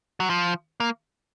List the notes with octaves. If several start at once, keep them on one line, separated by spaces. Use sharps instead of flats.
F#3
F3
A#3